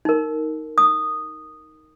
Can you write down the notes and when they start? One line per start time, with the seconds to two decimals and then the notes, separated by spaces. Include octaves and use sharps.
0.05 D#4 A#4
0.78 D#6